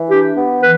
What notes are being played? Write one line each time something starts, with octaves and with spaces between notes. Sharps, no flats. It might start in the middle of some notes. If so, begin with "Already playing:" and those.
Already playing: E3
D4 G4
B3
E3 B4